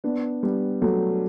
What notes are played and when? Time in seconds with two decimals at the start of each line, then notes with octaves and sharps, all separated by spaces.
0.04 B3 D4
0.43 G3 B3
0.82 F#3 A3